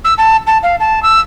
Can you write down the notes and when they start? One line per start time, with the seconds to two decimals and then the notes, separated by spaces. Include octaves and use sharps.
0.05 E6
0.18 A5
0.47 A5
0.63 F5
0.80 A5
1.03 E6